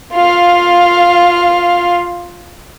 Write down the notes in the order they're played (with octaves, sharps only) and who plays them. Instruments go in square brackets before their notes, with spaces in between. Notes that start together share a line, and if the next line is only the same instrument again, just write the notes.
[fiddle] F4 F5